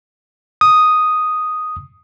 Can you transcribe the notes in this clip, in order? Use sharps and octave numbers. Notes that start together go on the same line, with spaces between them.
D#6